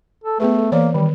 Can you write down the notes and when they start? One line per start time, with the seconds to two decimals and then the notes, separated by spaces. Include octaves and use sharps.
0.24 A4
0.40 A3 B3 G#4 B4
0.58 A4
0.72 E3 A#3 C#5 D5
0.94 D#3 G3